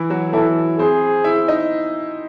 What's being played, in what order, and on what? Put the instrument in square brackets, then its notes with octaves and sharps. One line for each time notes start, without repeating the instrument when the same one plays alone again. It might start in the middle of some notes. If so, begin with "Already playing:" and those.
Already playing: [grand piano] E3 E4
F#3 F#4
[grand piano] E3 E4 [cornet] A4
[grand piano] C4 C5 [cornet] G#4
[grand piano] E4 E5
D#4 D#5